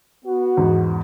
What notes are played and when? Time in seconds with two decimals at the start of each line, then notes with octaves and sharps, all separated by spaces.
0.25 B3 F#4
0.57 E2 G#2